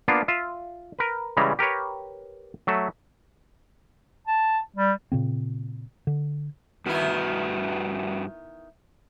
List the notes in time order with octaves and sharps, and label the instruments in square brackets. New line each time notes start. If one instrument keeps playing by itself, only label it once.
[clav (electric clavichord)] A#3 B3 D4 F4
F4 E5
A#4 B4
C#3 E3 G3 G#3 A#5
G4 A#4 B4 C#5
F#3 A3 E5
[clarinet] A5
G3
[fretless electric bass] A#2 C#3 C4
D3
[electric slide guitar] G2 F#4 B4 [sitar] D#3 B3 E4